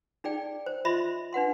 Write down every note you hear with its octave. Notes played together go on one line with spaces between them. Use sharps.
D#4 G#4 D5 G5
C5
F4 C5 D#5 E5 B5 C6
D4 B4 F#5 C6